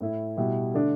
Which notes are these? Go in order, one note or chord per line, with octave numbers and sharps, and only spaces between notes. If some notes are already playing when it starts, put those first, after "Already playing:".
A2 A3 E4
B2 G3 E4 G4
D3 A3 D4